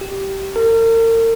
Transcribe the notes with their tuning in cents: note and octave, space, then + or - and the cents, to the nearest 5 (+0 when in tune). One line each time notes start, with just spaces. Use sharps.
G4 -15
A#4 -40